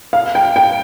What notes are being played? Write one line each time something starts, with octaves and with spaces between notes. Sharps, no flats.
F5
G5
G5